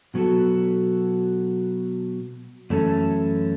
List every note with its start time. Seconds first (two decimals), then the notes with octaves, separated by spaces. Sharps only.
0.14 B2 F#3 B3 F#4 A4
2.70 F#2 E3 A3 C#4 A4